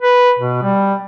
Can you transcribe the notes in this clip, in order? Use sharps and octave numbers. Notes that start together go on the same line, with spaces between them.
B4
B2
G3